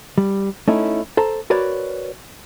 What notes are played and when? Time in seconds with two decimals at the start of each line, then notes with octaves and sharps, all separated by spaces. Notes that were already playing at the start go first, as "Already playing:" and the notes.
0.18 G3
0.68 A3 C#4 D#4 E4
1.17 A4 C5 A#5
1.50 F#4 A#4 B4 C#5 D5